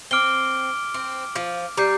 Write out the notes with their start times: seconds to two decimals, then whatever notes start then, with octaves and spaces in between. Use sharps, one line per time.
0.11 C4 D6 F6 D7 G7
0.94 C4
1.35 F3
1.77 G3 A#5 D6 G6 C7